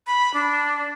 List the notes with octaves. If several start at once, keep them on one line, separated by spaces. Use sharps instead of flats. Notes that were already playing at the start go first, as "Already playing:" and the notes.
B5
D4